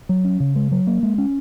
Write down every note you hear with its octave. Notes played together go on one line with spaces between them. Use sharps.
F#3
C#4
C#3
G#3
F#3
A#3
G#3
C#4